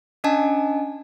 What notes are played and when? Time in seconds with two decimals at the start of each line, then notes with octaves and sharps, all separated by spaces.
0.24 C#4 D4 D#5 G#5 A5